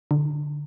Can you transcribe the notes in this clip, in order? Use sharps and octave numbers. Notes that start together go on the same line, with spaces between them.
D3